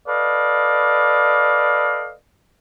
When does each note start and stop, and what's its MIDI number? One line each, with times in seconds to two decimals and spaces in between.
0.07 2.13 69
0.07 2.13 71
0.07 2.13 74
0.07 2.13 75
0.07 2.13 77